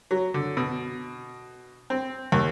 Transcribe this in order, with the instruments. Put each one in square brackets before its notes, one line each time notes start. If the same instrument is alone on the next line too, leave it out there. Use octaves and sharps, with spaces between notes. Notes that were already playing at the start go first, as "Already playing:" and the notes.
[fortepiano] F#3
D3
B2
C4
D#2